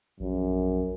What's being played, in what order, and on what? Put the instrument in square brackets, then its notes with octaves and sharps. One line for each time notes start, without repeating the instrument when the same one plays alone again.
[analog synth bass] A#1 [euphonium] F#2